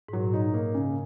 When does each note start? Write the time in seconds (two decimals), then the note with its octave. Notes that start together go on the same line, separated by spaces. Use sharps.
0.08 G#2
0.13 A#2 F#3
0.34 D#4
0.54 A#3
0.74 C#3